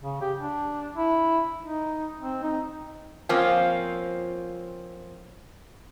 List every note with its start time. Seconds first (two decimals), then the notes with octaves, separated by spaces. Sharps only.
0.03 C#3
0.21 G4
0.38 D4
0.96 E4
1.61 D#4
2.20 C4
2.43 D#4
3.29 F3 A#3 C4 C#4 F4